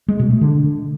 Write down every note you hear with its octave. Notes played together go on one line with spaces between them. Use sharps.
G#3
B2
A3
D3